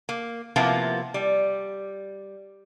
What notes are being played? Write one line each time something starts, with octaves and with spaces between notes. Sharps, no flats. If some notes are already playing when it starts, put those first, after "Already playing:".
A#3
C3 F3 A#3 B3 E4 F4
G3